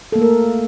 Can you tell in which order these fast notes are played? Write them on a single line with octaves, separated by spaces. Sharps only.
A4 A#3 A3 A#4